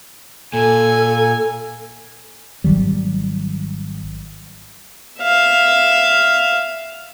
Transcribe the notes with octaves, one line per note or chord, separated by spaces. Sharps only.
A#2 A4 G#5
G#1 D#3 F#3 G3
E5 F5